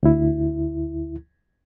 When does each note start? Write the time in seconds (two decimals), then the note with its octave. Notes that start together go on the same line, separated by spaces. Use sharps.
0.03 D2 E4